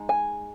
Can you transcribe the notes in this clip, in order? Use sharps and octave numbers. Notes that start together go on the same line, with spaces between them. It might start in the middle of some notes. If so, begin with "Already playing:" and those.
Already playing: G#3 D#4
G#5